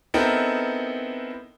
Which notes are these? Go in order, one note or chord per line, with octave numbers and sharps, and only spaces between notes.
B3 C4 D#4 E4 A4 A#4